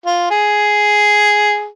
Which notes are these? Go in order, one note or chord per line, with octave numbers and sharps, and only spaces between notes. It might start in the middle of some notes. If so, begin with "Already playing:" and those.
F4
G#4